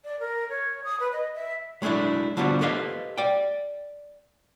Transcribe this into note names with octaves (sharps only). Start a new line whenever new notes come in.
D5
A#4
C#5
D#6
B4
D#5
E5
F#3 G#3 A3 D4 E4
D3 F3 G3 B3 F4 F#4
G4 A4 B4 C5 D#5 F5
D5 G5